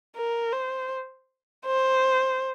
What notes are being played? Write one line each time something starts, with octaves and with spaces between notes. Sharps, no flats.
A#4
C5
C5